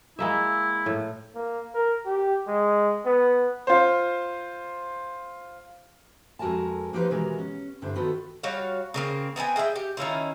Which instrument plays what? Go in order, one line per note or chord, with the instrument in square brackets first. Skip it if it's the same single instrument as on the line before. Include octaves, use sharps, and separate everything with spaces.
[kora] G#3 A#3 E5 [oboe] E4
[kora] A2
[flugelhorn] A#3
A#4
G4
G#3
B3
[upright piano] F4 C5
[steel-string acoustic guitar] F2 G#3 F#4 A#4 G#5 A5
F3 A#3 D#4 G4 B4 C5
B2 D#3 E3 G#3 F#4 A#4
C#4
G2 D3 E4 C5
D#3 B3 F4 F#4 A4 B4
[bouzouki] G3 F#4 C#5 F5
C#3 A#3 C4
B3 C4 G5 G#5
F4 G#4 E5 G5
G4
D#3 C#4 E4 F4